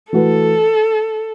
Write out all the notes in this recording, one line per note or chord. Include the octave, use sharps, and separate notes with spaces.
E3 A3 F#4 A4 B4